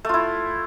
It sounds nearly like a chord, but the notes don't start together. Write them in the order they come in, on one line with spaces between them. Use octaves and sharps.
A3 F4 E4